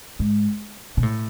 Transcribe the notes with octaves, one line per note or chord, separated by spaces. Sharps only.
G#2
B2
A2